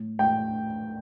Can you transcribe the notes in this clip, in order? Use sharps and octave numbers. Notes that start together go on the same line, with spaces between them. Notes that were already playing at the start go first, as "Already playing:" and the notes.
Already playing: A2
A2 G5